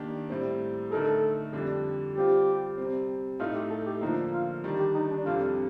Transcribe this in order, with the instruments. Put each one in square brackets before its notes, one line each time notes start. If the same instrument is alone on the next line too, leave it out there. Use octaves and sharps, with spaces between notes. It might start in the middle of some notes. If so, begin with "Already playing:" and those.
Already playing: [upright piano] D#3 A#3 D4 G4
A2 G3 C4
[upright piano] D3 A3 D#4 A#4 [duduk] A4
[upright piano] F2 D3 G3 D4
[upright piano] G3 C4 F4 [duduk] G4
[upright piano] C3 G3 C4
[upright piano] A2 A3 D#4 A4 [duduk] F4
[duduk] G4
A4
G4
[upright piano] D3 F3 A#3 [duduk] D#4
[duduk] F4
[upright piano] D#3 G3 D4
[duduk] G4
D#4
D4
[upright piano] F2 C3 G3 D4 A4 [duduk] F4